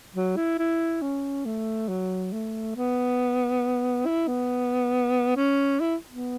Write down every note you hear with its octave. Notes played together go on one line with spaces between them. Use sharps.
F#3
E4
E4
C#4
A3
F#3
A3
B3
E4
B3
C#4
E4
B3